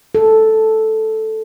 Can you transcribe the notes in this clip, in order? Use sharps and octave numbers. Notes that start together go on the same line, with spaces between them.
A4